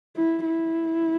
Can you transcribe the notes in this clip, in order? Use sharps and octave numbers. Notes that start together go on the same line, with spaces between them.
E4
E4